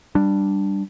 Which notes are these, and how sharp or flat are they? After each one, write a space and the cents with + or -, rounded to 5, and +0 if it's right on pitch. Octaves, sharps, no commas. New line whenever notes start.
G3 +0 D4 +0